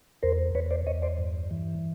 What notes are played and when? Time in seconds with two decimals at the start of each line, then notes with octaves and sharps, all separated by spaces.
0.23 E2 A#4 C5
0.55 E2 B4 C#5
0.71 C5 D5
0.87 E2 C#5 D#5
1.02 C5 D5
1.18 G2
1.51 E3